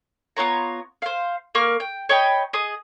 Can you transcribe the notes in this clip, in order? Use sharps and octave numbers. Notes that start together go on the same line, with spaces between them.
B3 F4 C#5 A#5
C5 F5
A#3 A#4 C#6 F6
G5
C#5 D#5 G5 B5
G#4 D#5 D#6